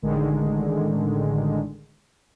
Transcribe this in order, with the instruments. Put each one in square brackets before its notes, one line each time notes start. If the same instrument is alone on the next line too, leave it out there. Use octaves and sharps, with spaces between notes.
[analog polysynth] A1 D3 D#3 G#3